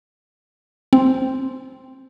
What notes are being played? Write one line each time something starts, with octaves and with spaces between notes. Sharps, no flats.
C4